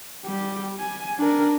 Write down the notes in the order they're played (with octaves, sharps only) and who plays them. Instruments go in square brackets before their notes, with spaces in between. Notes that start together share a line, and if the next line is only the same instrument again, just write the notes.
[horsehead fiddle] G3 G4
G#5
D4 A#4